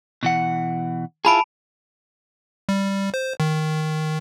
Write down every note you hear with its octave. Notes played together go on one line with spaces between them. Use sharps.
B2 E3 F#5
E4 F4 G#4 A5 B5 D7
G3
C5
D#3